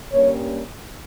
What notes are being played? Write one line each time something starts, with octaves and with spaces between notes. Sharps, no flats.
G2 G3 A#3 C#4 C#5